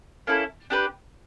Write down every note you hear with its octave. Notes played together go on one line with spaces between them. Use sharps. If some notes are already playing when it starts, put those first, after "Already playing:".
A#3 C#4 E4 A4
D4 G4 B4